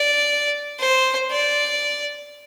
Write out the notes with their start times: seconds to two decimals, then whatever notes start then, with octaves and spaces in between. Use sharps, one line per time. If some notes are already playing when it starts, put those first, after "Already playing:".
Already playing: D5
0.79 C5
1.31 D5